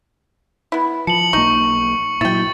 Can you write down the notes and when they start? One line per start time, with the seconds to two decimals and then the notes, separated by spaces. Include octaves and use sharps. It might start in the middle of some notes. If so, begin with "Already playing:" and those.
0.72 B3 E4
1.07 F3 A5 C#7 F#7
1.33 B1 A#3 D#4 C#6
2.21 A#2 F#3 E4 G5 A6